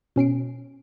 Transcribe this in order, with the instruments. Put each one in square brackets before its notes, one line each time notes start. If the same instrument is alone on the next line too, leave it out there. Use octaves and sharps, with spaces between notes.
[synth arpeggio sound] B2 C#4 C7 D7